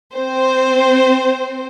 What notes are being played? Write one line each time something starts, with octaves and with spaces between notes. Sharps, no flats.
C4 C5